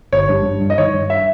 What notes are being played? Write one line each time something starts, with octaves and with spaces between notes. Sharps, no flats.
G1 C#5
G2
G2
G2
D#5
D#3 C#5
G2
E5